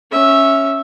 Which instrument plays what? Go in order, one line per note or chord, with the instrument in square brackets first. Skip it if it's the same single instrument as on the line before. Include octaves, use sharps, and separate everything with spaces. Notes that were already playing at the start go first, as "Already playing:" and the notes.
[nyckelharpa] C#4 E5